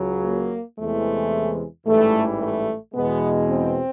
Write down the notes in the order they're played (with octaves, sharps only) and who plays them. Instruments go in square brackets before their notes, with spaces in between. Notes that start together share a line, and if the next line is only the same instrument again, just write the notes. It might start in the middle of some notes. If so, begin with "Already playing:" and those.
Already playing: [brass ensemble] C#2 C#3 F#3
A#3
E2 C3 E3 G#3 A3
A1 G#2 E3 G3 A3
A3
E2 B2 G#3 B3
C4